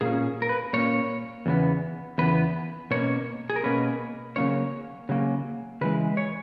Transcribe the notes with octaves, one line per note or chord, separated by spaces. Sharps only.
A#2 A#3 C#4 G#4
A#4
B4
A#2 A#3 C#4 C#5
E2 C#3 E3 B3
E2 C#3 E3 B3 B4
B2 A#3 C#4 C#5
G#4
A#4
B2 A#3 C#4 B4
C#3 F#3 A#3 C#4 C#5
C#3 F#3 A#3 C#4
C#3 E3 G#3 B4
C#5